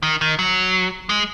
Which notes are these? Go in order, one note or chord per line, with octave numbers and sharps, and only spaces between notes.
D#3
D#3
F#3
G#3